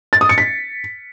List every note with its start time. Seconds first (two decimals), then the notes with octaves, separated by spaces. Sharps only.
0.13 A6
0.21 D#6
0.29 C#7
0.38 B6